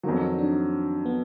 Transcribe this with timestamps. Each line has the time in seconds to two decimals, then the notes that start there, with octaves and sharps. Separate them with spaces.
0.03 F2 D#3 F#3 F4
0.21 D#4
0.39 D4
1.06 B3